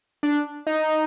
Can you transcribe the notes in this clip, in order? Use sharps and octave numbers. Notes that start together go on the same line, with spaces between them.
D4
D#4